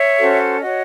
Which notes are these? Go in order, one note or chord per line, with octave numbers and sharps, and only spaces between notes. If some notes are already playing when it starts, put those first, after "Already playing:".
Already playing: C#5 E5
C#4 F#4 A4 C5
F#4 C#5 D#5